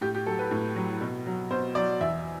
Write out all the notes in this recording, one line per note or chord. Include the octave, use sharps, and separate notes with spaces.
A2 G4
G4
F#3 A4
B4
A2
F#3
B2
F#3
B2 C5
F#3 D5
E2 E5